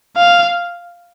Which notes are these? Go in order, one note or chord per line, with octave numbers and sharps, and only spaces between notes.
F5